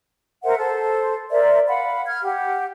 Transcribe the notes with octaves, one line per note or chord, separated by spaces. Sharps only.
A#4 C5 E5 F#5
A4 C5
A#4 C5 D5 E5
F5 F#5 B5
F6 G#6
G4 F#5